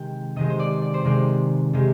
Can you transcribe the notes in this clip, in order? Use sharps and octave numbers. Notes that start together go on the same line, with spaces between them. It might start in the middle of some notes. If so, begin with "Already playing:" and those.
Already playing: C3 D#3 G#3 G5
C3 D#3 G#3 D#5
C5
D5
D5
C5
C3 D#3 G#3 D5
C3 D#3 G#3